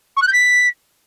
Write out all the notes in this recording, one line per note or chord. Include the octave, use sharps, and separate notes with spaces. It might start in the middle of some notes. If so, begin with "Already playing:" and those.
C#6
F#6
G6
B6